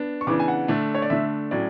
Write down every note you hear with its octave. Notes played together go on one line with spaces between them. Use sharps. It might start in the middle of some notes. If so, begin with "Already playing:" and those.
Already playing: B3 D4
C#6
C#3 E3 B3 D4 D6
G#5
F#5
D3 A3 D4
C#5
D5
D3 A3 D4 E5
A2 F#3 C#4 D5